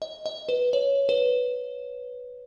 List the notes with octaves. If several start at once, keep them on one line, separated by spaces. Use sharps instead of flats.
D#5
D#5
B4
C#5
B4